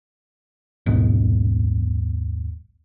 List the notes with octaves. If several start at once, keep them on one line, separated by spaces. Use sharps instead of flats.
D#1 B1 G#2 B2